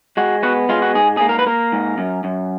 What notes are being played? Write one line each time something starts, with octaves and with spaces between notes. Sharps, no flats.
G#3 F#4
B3 F#4
G#3 F4
F#4
G#2 G#4
A#3 G#4
A#4
B4
A#3 A#4
G#2
F#2
F#2